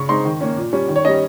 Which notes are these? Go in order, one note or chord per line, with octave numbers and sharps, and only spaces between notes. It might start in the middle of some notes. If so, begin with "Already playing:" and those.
Already playing: C#3 C#6
G#3 C4 D#4 C6
D#3
A#3 C#4
A#2
G3 C#4
D#3
C#5
G3 C#4 D#5